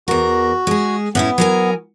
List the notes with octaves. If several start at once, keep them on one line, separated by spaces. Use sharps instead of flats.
E2 F#4 A#4
G#3 G#4
A2 B3 C#4 E4
F#3 A#4 G#5